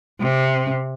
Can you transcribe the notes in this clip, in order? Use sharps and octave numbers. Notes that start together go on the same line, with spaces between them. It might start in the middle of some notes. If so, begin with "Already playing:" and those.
C3